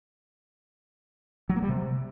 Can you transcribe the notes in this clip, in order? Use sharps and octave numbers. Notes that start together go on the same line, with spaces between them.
F#3
A#3
G3
C3